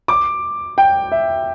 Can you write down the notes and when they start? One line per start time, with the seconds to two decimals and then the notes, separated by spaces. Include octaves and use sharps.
0.08 D6
0.78 G5
1.12 E5